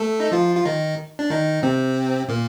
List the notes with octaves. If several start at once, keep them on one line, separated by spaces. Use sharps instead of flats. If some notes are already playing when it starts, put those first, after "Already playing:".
Already playing: A3 A4
D#4
F3 F4
F4
D#3 D#4
D4
D#3 D#4
C3 C4
A#2 A#3